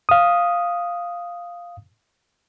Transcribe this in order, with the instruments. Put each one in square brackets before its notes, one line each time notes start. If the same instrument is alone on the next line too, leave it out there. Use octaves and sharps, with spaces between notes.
[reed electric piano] F5 D#6